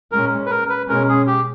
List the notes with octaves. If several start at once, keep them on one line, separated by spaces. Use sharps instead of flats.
A#2 G#3 C#4 A#4
B4
A#4
B4
B2 G#3 C#4 A#4
G#4
G4